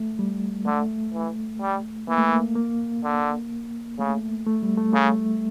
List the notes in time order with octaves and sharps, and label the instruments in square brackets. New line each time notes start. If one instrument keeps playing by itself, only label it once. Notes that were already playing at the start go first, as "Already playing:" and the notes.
Already playing: [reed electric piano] A3
G3
[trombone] D3 [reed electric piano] A3
[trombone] E3
G3
[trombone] E3 [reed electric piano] A#3
[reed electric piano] A3
A#3
A#3
[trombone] D3
[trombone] C#3 [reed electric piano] A3
[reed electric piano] A3
G3
A3
[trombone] C#3 [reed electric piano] A3